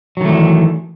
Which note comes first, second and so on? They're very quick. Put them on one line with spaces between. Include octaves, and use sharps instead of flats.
F#3 D#3 A3 E3